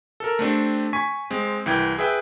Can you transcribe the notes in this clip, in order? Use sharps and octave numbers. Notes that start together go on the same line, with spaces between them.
A4 A#4
A3 C4 D4 G4
G#5 C#6 B6
G#3 C4
C2 E3 G5 G#6
G#4 B4 E5 G5